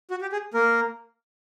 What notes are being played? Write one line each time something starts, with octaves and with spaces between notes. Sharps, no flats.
F#4
G4
G#4
A#3 A#4